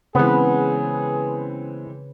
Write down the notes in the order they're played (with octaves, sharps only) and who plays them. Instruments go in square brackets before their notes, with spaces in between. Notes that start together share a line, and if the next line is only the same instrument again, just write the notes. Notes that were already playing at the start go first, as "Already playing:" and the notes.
[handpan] C#3 B4 [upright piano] E3 G#3 C4 [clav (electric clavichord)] B3 [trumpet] G#4